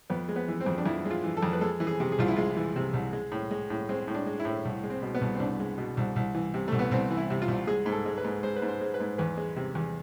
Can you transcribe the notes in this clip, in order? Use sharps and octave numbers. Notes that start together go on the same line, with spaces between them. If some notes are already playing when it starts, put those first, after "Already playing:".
F2 B3
G#3
B3
E3
C4
F2
D4
F2 E4
G#3
F4
E3
A4
F2
B4
G#3 A4
E3
G#4
C3
G#4
C2 F4
E4
G#3 F4
E3
C3
C2
G#3
A2
G#3
A2
G#3 C4
A2
D4
G#3
E4
A2
C2
G#3
C4
B2
B3
C2
C4
C2 D4
G#3
B2
C2
C2
E3
C3
C2 A3
B3
C2 C4
E3
E4
C3
F4
C2
G#3 G#4
G#2
A4
G#3
B4
G#2
G#3 C5
B4
G#2
C5
G#3
B4
G#2
E2 B4
G#3
C3
E2